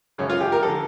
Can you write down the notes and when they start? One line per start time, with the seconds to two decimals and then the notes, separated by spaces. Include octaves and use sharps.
0.18 G#1 F#2 C#3 C#4
0.30 F4
0.41 G4
0.52 A#4
0.62 D3 F3 A4